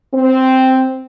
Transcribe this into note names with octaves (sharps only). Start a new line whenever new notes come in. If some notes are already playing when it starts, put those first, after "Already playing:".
C4